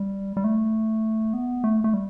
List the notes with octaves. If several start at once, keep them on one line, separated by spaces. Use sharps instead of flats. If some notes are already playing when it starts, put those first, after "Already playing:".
Already playing: G3
G3
A3
B3
A3
A3
G3